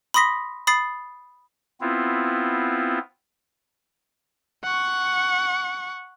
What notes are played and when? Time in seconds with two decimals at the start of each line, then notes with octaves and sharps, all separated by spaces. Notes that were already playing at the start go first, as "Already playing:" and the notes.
0.14 B5 C6 D#6 A#6 B6
0.67 B5 D#6 A6 C7
1.81 B3 C4 E4 F4
4.64 F#5 C#6